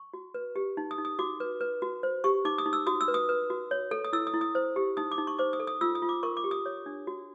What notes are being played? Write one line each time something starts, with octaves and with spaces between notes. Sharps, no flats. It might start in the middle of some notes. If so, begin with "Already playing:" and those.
Already playing: C#6
F#4
B4
G4
D#4
D#6
D#4
D#6
F#4 D6
B4
B4
F#4
C5
G4 C#6
D#4 D6
D#6
D#4
E6
F#4 D#6
E6
B4
D#6
B4
F#4
C#5
A4
D#6
E4 E6
D#6
E4
D#6
C5
G4
D#4 D#6
D6
D#4
C#6
C5 D6
D#6
A4
D#6
F4 E6
D#6
F4
D6
A#4 C#6
D6
G4
D#6
C#5
D4
F#4